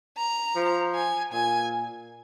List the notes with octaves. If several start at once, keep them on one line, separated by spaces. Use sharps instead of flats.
A#5
F3
G#5
A#2 G#5